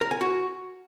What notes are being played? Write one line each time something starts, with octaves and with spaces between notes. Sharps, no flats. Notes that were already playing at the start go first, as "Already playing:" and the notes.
A#4
G#5
F#4